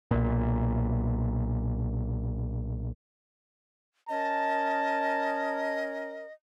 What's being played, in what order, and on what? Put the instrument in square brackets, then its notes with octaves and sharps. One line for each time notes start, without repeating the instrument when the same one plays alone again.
[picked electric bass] B1 A#2
[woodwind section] C#4 A#4 [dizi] D#5 [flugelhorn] A5